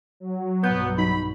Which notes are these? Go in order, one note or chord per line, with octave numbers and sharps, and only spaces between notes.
F#3
B1 G2 B2 B3 G6
D#4 B5